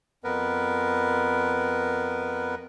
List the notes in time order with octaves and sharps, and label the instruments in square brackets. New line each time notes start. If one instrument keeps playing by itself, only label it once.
[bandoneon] F2 B3 A#4 B4